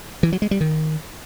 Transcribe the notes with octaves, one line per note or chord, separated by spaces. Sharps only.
E3
F#3
G#3
G3
D#3